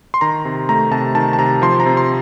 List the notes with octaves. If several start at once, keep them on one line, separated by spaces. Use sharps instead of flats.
C6
D#3 A#5
C3
A3 A#5
C3 A5
D#3 A5
A5
C3 A#5
F3 C6
A#5
C3
C6